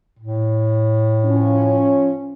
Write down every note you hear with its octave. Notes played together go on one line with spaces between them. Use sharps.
A2
F3 C#4